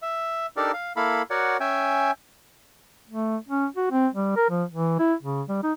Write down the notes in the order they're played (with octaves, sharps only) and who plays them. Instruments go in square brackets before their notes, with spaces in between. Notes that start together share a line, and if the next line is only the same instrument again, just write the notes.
[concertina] E5
D4 D#4 G4 A4 A#4 D5
F5
A#3 E4 A4 F5 B5
F#4 A#4 C#5 D5 F#5
C#4 E5 G5 G#5
[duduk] A3
C#4
F#4
C4
G3
A#4
F3
E3
E4
C#3
G3
D#4